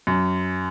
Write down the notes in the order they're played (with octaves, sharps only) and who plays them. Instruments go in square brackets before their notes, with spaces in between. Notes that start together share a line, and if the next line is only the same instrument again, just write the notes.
[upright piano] F#2